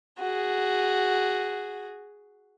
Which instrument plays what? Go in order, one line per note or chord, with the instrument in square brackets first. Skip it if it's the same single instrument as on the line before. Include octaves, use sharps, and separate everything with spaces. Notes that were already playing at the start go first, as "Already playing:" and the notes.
[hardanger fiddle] F#4 G#4